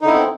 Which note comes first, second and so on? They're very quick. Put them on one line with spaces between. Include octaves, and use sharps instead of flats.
D#4 D3 E4 B3 C4